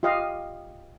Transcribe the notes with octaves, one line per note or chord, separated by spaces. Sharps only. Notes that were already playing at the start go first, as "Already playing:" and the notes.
F4 G4 D#5 F5